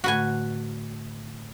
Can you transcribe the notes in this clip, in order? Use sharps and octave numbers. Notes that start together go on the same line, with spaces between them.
A2 D3 A3 F#4 B4 G#5